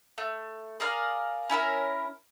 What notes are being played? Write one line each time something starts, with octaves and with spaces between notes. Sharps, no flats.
A3
G#4 A#4 D5 F5
C#4 E4 A4 A#4